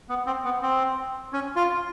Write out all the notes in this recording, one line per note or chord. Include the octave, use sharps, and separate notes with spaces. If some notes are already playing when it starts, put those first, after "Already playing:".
B3
C4
B3
C4
C#4
F4